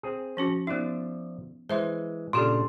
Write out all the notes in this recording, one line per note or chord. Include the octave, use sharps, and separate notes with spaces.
C4 G#4
F3 C#4 F#4
F3 B3 D#4 D5 E5
E3 G#3 C5 E5 C6
A#2 C#3 D4 F4 G4 A4 C6